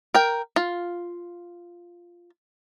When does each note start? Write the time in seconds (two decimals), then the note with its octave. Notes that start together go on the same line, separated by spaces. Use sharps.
0.14 A#4 G5
0.56 F4